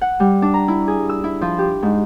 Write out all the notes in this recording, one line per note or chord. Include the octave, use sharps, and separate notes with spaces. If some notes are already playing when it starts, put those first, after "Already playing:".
F#5
G3
D4
A#5
E4
G#4
E6
E4
F3
G4
G#2